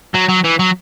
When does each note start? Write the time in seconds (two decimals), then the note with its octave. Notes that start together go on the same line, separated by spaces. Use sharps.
0.14 F#3
0.28 F#3
0.44 E3
0.59 F#3